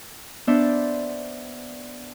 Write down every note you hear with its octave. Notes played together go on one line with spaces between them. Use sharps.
B3 D4 C5 D5 E5